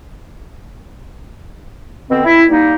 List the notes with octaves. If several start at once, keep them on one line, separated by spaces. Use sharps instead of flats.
B2 D3 B3 C4
E4
G3 A#3 D#4